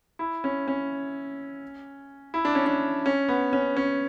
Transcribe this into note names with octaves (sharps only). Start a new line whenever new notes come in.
E4
C#4
C#4
E4
D4
C#4
D4
C#4
B3
C#4
C#4